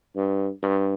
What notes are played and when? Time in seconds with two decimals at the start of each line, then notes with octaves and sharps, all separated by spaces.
0.16 G2
0.63 G2